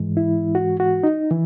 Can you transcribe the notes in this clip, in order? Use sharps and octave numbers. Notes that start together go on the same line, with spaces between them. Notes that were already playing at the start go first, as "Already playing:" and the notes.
Already playing: G#2 E3 G#3
E4
F#4
F#4
D#4
E3